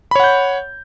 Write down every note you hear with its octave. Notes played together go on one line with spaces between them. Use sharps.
C#5 F#5 B5 G6